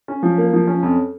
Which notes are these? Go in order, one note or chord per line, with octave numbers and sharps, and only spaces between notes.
C#4
F3
A#3
F3
C#4
F2